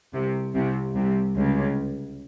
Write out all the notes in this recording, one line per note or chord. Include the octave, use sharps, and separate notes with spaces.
C2 C3
C2 C3
C2 C3
C#2 C#3